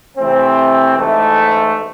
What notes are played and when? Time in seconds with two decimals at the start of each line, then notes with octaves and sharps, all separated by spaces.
0.18 C3 E3 A3 C4
0.97 A1 G#2 E3 A3